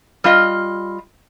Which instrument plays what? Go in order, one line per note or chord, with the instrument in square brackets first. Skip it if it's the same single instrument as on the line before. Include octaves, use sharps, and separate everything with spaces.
[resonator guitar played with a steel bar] G3 F4 D#5